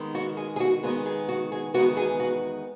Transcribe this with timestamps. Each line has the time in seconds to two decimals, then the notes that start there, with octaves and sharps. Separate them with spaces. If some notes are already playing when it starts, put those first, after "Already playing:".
Already playing: D#3 G#3 B3
0.15 F#4
0.37 G#4
0.56 G#4
0.60 F#4
0.83 D#3 G#3 B3 G#4
1.06 G#4
1.28 F#4
1.52 G#4
1.74 E2 D#3 G#3 B3 F#4
1.97 G#4
2.20 F#4